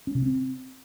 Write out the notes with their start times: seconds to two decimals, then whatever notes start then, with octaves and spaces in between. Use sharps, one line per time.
0.07 C#4
0.15 C3
0.22 C4